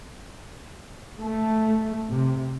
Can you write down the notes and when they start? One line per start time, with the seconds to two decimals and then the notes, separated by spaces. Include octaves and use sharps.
1.21 A3
2.08 C3